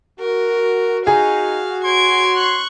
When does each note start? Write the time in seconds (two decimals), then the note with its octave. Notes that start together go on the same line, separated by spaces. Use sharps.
0.20 F#4 A#4
1.07 D#4 G#4 F5
1.85 C#5 C6 G#6 D7
2.37 C#6 F#6